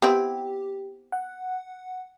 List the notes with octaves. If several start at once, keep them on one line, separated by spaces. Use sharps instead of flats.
B3 C4 E4 G4
F#5